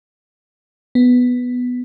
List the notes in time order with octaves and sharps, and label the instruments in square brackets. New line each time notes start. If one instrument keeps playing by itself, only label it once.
[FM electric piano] B3